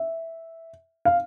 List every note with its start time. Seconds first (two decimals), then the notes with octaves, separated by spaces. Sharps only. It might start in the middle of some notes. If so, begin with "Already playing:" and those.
Already playing: E5
1.05 F5